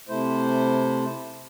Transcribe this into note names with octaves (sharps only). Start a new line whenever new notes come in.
C3 A3 E4 C5